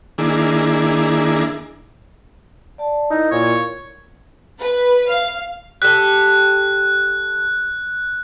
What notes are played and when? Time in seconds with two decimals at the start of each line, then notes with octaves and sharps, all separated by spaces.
0.18 D#3 A#3 D4 E4 G#4
2.78 D5 A5
3.11 D#4 E4 A#4
3.32 A#2 C#5
4.60 B4
5.11 F5
5.82 G4 A4 F#6